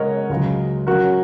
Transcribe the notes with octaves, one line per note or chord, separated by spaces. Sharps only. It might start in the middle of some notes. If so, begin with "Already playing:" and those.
Already playing: C#3 G#3 C#4 A#4 C#5 D#5 F#5
C#2 C#3 F#3
C#3 F#3 C#4 F#4 A#4